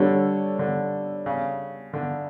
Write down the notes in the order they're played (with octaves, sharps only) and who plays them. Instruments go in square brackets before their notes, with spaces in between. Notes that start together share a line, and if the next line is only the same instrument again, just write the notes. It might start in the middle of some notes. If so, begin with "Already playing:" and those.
Already playing: [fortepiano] D3 [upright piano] G3 D4 A4 C#5
[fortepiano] D3
C#3
D3